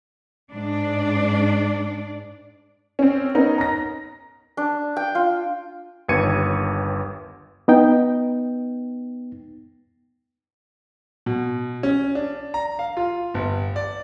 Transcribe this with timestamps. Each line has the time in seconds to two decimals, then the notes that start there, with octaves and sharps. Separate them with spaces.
0.51 G#2 D4 D5
2.99 C4 C#4
3.35 B3 C#4 D#4 A#4
3.58 A#5 A#6
4.57 D4
4.97 G5
5.15 F4
6.09 G1 D#2 B4 G#6 C#7 D#7
7.68 B3 D#4 G5
11.26 B2
11.83 C#4
12.15 D4
12.54 A#5
12.79 F5
12.97 F4
13.34 G1
13.76 D5